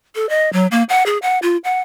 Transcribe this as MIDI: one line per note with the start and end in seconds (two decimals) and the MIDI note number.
0.15 0.28 69
0.29 0.51 75
0.53 0.67 54
0.71 0.83 58
0.89 1.03 78
1.06 1.18 68
1.22 1.39 78
1.42 1.57 65
1.64 1.81 78